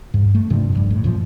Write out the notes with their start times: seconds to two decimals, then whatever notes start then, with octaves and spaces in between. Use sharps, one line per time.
0.14 G2
0.35 A3
0.50 G2 C3 F3
0.72 F1 B1 G2
0.90 A2
1.04 F#2 A#2 F3